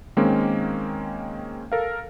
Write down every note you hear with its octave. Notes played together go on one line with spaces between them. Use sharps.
D#3 G#3 A#3 C4 C#4
A4 A#4 F5